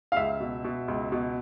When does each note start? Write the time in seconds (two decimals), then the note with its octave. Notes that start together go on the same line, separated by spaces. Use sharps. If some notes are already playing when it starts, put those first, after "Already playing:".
0.12 F5
0.17 C#2 E5
0.40 B2
0.65 B2
0.88 C#2
1.12 B2